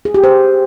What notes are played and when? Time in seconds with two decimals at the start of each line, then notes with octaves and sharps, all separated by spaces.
0.05 G#4
0.14 G4
0.24 C5